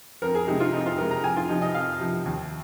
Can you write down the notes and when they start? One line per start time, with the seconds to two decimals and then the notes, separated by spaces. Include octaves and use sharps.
0.22 F2 A#4
0.35 G#4
0.47 C3 G#3 D#4
0.60 F4
0.73 F2 D#4
0.86 F4
0.98 C3 G#3 A#4
1.11 A#5
1.24 F2 G#5
1.36 F4
1.49 C3 F3 D#4
1.62 D#5
1.75 F2 F5
2.00 C3 F3
2.26 D#2